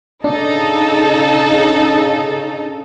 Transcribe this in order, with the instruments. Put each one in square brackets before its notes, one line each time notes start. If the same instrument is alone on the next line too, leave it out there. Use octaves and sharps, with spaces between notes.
[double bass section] C#3 [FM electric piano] D4 [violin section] D#4 A4